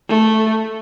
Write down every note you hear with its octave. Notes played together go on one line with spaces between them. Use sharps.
A3